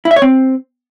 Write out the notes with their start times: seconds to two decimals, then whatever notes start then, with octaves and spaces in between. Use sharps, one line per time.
0.05 E4
0.11 E5
0.16 C#5
0.22 C4